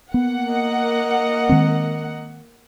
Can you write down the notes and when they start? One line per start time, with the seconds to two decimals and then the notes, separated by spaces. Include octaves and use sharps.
0.14 A#3 B3 F#5
0.48 A#4 D#5
1.49 D#3 G#3 C4